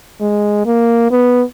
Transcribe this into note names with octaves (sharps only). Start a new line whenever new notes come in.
G#3
A#3
B3